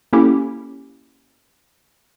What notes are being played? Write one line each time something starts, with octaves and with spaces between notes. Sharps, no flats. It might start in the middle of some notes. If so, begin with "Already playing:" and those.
A#3 C#4 E4 G4 A4